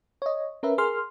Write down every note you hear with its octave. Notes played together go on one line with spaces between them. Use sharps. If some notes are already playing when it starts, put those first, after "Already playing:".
C#5 D#5
C#4 A#4 B4 E5
G#4 A#4 C6 F6